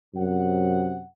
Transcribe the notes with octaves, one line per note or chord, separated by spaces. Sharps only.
F#2 C3 F#5